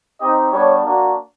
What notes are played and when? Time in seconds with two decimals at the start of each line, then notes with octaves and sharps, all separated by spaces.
0.21 C4 D#4 G4 D#5
0.52 G3 B3 D4 C#5
0.84 A#3 D4 F#4